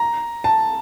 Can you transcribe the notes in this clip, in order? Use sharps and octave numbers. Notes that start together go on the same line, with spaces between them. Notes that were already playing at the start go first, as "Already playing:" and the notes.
Already playing: A#5
A5